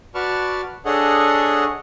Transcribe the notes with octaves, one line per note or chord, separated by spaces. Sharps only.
F#4 B4 D5 A5 C#6 F6
D4 G#4 A4 C#5 D#5 F#5